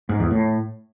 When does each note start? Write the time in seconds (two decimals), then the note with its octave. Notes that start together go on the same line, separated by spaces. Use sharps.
0.09 G#2
0.20 E2
0.31 A2